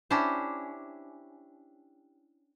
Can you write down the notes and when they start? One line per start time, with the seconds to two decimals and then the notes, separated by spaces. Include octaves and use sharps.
0.10 C#4 D4 E4 G4 C5